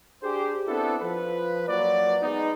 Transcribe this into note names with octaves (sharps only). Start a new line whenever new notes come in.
D4 G4 G#4 C5
B3 C4 D4 E4 A4
F3 B4
F3 F#3 A#3 F#4 B4 D5
G#3 B3 D#4